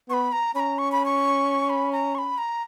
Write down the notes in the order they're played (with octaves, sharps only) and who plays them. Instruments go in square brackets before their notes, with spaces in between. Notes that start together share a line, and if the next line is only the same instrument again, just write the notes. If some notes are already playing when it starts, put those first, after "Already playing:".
[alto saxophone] B3 [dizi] C#6
[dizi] B5
A#5
[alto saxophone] C#4 [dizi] B5
[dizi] A#5
C#6
B5
C#6
B5
A#5
C#6
B5
A#5